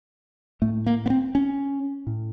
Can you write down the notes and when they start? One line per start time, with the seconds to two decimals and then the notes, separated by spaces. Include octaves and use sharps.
0.62 A2 A3
0.86 A#3
1.06 B3
1.10 C4
1.35 C#4
2.07 A2